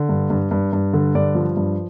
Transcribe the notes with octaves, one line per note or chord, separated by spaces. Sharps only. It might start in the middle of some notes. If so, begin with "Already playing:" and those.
Already playing: D3
G2
G2
G2
G2
D3
G2 D5
F3
G2